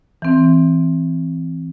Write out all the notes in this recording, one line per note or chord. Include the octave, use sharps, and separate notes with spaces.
E3 C4